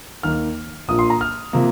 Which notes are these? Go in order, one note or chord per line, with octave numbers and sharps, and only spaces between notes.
D#2 D#3 A#3 F6
A#1 A#2 F3 A#3 D#6
C6
A#5
F6
C3 F3 A#3